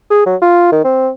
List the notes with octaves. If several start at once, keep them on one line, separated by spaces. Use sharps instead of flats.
G#4
F#3
F4
D#3
C4